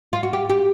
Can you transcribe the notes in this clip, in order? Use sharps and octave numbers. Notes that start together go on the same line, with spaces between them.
F4
F#4
G4
G4